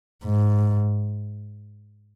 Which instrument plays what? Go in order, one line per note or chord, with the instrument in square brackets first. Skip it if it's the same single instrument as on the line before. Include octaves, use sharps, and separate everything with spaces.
[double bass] G#2